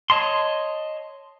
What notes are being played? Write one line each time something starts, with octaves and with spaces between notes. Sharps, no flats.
C#5 D#5 A5 C6